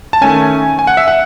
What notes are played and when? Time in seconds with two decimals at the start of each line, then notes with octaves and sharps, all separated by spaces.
0.13 A5
0.21 D#3 A3 C#4 G#5
0.79 G#5
0.87 F#5
0.97 E5
1.08 F#5